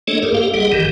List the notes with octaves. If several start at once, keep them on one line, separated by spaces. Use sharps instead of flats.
A3 A#3 D4 A4 C#5 D#5
G2 G#4 A#4
A#3 G4 A4 F5
F#1 G3 G#4 D#5 F#5
G#1 G2 D#3 E3 G4